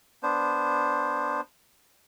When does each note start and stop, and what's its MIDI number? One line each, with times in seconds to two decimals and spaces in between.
0.23 1.41 59
0.23 1.41 62
0.23 1.41 72